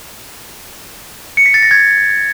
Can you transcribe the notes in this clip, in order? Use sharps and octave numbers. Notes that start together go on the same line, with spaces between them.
C#7
B6
A6
A#6
G#6